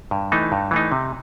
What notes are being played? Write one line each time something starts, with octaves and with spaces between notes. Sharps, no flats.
G2
E3 A3 D#4
G2
E3 A3 D#4
C3